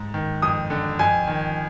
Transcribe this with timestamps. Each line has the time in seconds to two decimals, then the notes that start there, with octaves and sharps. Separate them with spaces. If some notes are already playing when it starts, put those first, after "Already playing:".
Already playing: G#2
0.14 D#3
0.42 F2 D#6
0.70 D3
0.99 F2 G#5
1.27 D#3